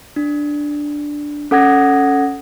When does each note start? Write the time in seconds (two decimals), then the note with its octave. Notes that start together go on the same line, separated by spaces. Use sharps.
0.16 D4
1.51 C#4 A4 F#5 D#6 G#6 A#6